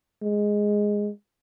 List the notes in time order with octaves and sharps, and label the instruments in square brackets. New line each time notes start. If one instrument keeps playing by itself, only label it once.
[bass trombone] G#3